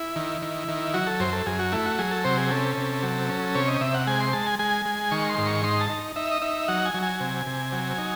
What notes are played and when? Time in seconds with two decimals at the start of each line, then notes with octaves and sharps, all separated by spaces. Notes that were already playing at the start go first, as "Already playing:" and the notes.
Already playing: E4
0.16 D#3
0.42 D#3
0.68 D#3
0.94 F#3 F#4
1.07 A4
1.20 F#2 C5
1.33 A4
1.46 F#2 G#4
1.59 F#4
1.72 A3 E4
1.86 F#4
1.98 F#3 G#4
2.11 A4
2.24 C3 C5
2.37 G#4
2.51 C#4 A4
2.77 C3
3.03 F#3
3.29 C#4
3.55 C3 C#5
3.68 D#5
3.81 C3 E5
3.94 F#5
4.07 G#3 G#5
4.20 C6
4.33 G#3 A5
4.46 G#5
4.59 G#3 G#5
4.86 G#3
5.11 D#3 C#6
5.29 C6
5.38 G#2
5.46 C#6
5.63 D#4 C6
5.81 A5
5.90 D#4
6.16 D#4 E5
6.31 D#5
6.42 D#4 E5
6.68 F#3 F#5
6.86 G#5
6.94 F#3
7.03 G#5
7.20 C3
7.46 C3
7.72 F#3
7.98 D#4